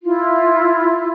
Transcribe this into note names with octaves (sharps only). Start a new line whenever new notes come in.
E4 F4